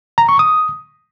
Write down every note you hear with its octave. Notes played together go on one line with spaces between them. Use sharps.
A#5
C#6
D#6